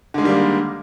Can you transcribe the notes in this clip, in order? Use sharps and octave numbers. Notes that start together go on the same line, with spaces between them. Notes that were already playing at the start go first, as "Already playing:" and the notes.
D3 D#3 G3 G#3 A#3